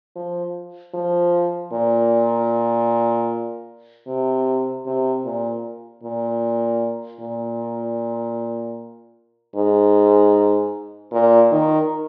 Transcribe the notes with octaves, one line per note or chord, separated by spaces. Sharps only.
F3
F3
A#2
C3
C3
A#2
A#2
A#2
G#2
A#2
D#3